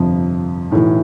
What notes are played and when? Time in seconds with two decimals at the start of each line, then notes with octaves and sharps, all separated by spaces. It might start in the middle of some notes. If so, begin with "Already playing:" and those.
Already playing: G1 F2 C3 F3
0.71 B1 A2 E3